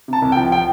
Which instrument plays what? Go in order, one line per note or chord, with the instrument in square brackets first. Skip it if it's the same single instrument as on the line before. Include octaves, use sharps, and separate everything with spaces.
[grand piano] C3 A5
C2
G5
F3
G5